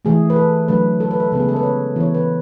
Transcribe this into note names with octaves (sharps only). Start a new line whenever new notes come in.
E3 A3 G#4
B4
A4
D3 F#3 A3 B4
A4
B4
A4
C#3 G#3 B3 B4
G#4
A4
B4
C#5
E3 B3 C#5
B4